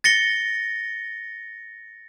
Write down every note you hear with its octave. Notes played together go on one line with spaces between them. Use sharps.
A6 A#6 C#7 G7